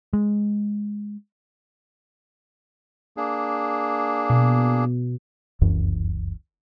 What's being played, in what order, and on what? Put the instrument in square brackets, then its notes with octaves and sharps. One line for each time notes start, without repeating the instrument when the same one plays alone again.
[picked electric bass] G#3
[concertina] A#3 D4 G#4
[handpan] B2
[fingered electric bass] F1 C#2 F#2 E3